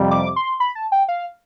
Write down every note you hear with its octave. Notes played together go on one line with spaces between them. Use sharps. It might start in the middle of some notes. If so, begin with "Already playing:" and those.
Already playing: F2 C3 G3
D6
C6
B5
A5
G5
F5